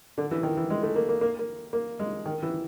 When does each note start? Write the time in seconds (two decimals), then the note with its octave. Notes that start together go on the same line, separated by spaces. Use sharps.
0.18 D3
0.31 E3
0.43 D#3
0.57 E3
0.70 G#3
0.83 A3
0.96 A#3
1.09 A#3
1.21 A#3
1.39 A#3
1.73 A#3
1.99 G#3
2.26 D#3
2.43 E3